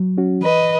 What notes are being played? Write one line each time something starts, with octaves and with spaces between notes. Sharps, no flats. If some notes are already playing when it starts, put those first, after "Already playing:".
Already playing: F#3
C#4 F#4
E3 B4 D#5